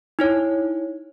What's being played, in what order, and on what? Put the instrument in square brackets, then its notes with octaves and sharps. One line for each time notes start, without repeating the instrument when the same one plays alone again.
[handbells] D#4 E4 C#5